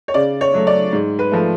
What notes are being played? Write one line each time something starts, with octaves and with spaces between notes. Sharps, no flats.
C#5
C#3 D5
C#5
F#3 A3
D5
G#2
B4
F3 A3